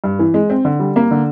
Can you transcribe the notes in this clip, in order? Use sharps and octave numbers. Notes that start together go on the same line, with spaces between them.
G2
E3
G#3
C4
D3
G3
A#3
D3